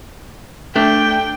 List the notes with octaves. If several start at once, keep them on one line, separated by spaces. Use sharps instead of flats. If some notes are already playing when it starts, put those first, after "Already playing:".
A3 D4 G5